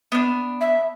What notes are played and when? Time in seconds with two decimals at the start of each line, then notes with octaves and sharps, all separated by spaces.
0.12 B3 D4
0.61 E5